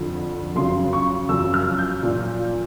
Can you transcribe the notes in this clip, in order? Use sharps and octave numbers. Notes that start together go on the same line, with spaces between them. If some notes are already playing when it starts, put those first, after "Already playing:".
Already playing: F2 D3 F3
F#2 C#3 F3 C6
C#6
F#2 C#3 F3 E6
F6
G6
A#2 F3